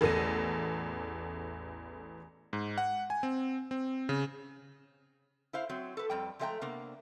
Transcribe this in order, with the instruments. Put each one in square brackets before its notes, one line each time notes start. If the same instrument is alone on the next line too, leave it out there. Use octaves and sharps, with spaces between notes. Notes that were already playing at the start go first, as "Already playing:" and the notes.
[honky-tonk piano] A1 E2 A3 A4 A#6 D#7
[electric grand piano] G#2
F#5
G#5
C4
C4
C#3
[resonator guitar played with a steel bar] E4 C5 F5
F#3 C4
A4 B4
F2 G3 G5
F3 G#3 A3 D5 G5 A#5
C3 A#3 B3 D4